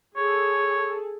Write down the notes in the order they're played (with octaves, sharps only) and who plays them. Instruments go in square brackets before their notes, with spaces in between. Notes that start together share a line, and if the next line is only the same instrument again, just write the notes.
[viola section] G#4 A4 [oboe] C#5